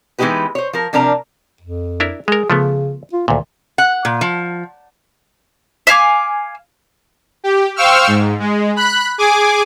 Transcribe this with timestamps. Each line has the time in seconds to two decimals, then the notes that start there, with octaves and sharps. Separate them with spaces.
0.19 E3 G#3 B3 D#4 G4 B4
0.55 C5 C#5
0.73 F3 A#4
0.93 C3 F3 D4 A#4 A#5
1.61 F2
2.00 D4 E4 A#4
2.28 G#3 G#4 A#4
2.50 C#3 F3 A3 B3
3.13 F4
3.28 D2 A#2 D#3
3.78 F#5
4.05 A#2
4.21 F3
5.87 E5 F5 G#5 D6
7.44 G4
7.76 C5 F5 G5 C#6 E6 F6
8.07 G#2
8.39 G#3
8.76 B5 F#6
9.18 G#4 G#5 D6